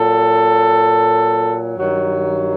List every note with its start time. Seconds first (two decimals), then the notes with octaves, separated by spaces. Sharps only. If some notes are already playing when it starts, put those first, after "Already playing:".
Already playing: A#2 F#3 A4
1.77 G2 D#3 F#3